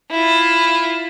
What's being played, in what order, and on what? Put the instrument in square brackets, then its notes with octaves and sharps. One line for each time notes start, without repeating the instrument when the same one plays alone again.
[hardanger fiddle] E4 F4